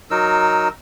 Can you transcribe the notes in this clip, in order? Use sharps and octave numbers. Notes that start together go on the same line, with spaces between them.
F#3 D#4 A#4 E6